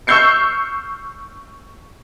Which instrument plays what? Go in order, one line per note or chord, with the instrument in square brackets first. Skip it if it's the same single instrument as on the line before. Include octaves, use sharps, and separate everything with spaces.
[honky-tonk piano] C#6 E6 F6 G6 C7 C#7